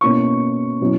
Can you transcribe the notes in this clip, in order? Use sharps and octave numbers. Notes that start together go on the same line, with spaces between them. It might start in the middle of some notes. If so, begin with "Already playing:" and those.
B2 A#3 C#4 E4 C#6
B2 F#3 C#4 E4